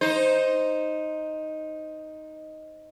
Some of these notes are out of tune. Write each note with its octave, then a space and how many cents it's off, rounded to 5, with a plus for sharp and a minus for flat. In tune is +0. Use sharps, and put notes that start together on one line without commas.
D#4 +0 C5 +0